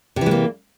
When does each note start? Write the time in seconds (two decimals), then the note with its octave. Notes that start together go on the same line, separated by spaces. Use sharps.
0.16 C3
0.21 E3
0.26 G#3
0.31 A#3